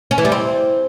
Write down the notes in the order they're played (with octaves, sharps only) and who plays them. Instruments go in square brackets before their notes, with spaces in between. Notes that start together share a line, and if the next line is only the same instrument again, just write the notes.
[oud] C#4
E3
G3
C4